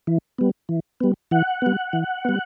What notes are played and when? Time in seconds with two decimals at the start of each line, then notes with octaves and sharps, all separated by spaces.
0.07 E3
0.38 G3 B3
0.69 E3
1.01 G3 B3
1.31 E3 F#5
1.62 G3 B3
1.93 E3
2.25 G3 B3